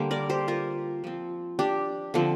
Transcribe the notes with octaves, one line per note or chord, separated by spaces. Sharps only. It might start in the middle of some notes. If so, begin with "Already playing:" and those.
Already playing: D3 G3 A#3 C5
A#4 D5
G4 C5
F4 A#4
F3 C4
D4 G4
D3 F3 C4